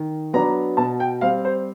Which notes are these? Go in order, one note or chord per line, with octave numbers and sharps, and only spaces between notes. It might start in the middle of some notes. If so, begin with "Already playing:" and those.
Already playing: D#3
F#3 B3 D4 A#5
B2 A5
G5
G3 C4 F5
C5